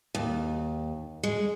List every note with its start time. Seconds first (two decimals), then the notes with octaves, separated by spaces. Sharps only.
0.15 D#2
1.23 G#3